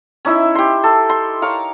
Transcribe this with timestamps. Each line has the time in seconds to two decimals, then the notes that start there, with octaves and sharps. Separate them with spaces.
0.25 C#4 D#4 E4 E5
0.55 G4 C6
0.84 A4
1.10 C6
1.42 A#4 C#5 F5